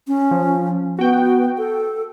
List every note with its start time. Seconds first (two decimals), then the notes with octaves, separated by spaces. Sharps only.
0.08 C#4
0.31 F3
0.99 B3 F#4 G5
1.58 A4